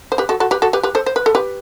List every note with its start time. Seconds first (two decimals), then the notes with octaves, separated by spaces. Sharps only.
0.12 C5
0.18 G4 B4
0.29 F#4 A4
0.40 F#4 A4
0.51 G4 B4
0.62 F#4 A4
0.73 G4 B4
0.83 G4 B4
0.95 A4 C5
1.06 C5
1.16 B4
1.26 A4
1.35 G4 B4